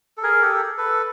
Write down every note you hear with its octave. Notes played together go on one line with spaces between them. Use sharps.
A4
G#4 A#4
G4 A4
A4 B4